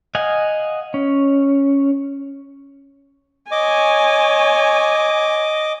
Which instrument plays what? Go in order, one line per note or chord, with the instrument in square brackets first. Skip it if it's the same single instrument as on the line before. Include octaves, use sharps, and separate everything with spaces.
[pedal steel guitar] D#5 F5 F#5 G#5
C#4
[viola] C#5 G#5 [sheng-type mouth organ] D#5 D6